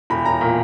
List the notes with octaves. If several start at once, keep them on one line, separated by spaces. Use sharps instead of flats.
E1 B5
E1 A#5
A#2